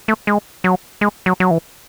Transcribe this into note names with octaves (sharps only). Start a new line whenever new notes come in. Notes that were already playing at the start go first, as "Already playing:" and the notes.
A3
G#3
F#3
G#3
F#3
F#3
E3